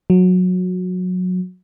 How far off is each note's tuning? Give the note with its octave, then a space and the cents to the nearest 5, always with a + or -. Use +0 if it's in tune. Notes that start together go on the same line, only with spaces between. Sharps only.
F#3 -20